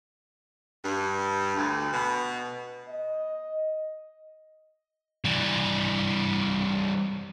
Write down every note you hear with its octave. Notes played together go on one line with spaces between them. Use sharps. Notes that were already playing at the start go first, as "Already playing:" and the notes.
G2
D2
B2
D#5
E3 G3